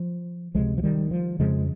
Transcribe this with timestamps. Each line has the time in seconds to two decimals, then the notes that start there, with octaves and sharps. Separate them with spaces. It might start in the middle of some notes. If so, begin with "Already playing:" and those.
Already playing: F3
0.55 C#2 C3 F3 G#3
0.78 F3
0.83 D#3 G3
1.11 F3
1.39 F2 C#3 F3 G#3